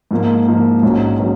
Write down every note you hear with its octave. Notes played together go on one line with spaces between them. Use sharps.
G#2 F3 A#3
G#2 F3 A#3
A#1 G#2 F#3 C#4
F#3 C#4